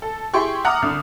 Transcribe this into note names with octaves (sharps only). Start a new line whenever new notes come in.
A4
E4 G4 G#4 G5 C6 C#6
F#5 A#5 D6 D#6 F6
C2 D3 F6